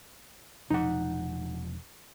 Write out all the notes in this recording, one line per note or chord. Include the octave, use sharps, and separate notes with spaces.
E1 F3 D#4 F#5